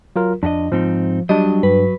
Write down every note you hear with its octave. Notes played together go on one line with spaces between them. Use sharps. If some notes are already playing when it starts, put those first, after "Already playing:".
F#3 F4 A#4
F2 D4 F#4 D#5
G#2 F3 C4 D#4
F#3 G3 D4 D#5
G2 B4